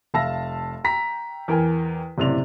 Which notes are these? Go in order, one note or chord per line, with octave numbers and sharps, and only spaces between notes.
F1 E5 F5 A5 E6 A#6
G5 A#5 B6
E2 A#4 G5 G#5
F#1 A2 C3 D5 F7